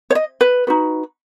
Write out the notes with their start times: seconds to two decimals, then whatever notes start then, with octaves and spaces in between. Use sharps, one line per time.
0.10 C#5
0.15 D#5
0.41 B4
0.67 D#4 F#4 B4